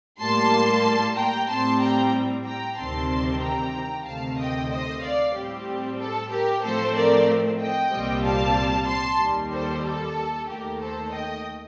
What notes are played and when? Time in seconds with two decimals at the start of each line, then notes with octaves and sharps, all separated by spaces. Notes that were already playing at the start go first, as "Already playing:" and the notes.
0.20 A2 G3 A#3 A5 C6
1.16 G5 A#5
1.49 A2 G3 C4 A5 C6
1.80 G5 A#5
2.45 G5 A#5
2.77 D2 C3 D#3 G3 C4 A5 C6
3.41 G5 A#5
4.05 D2 C3 D#3 A3 C4 F5 A5
4.37 D#5 G5
4.70 C5 D#5
5.02 D5 F5
5.34 A2 G3 C4 G4
5.99 A4
6.30 G4 A#4
6.63 A2 F3 A3 C4 A4 C5
6.94 A#4 D5
7.59 D#5 G5
7.91 C2 A#2 G3 C4
8.23 F5 A5
8.87 A5 C6
9.19 D#2 D#3 G3
9.51 A4 C5
9.83 A4
10.48 D#2 D#3 A3 G4 A#4
10.80 A4 C5
11.12 D#5 G5